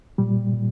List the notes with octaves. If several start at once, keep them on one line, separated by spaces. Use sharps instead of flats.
A#2 G3
A#2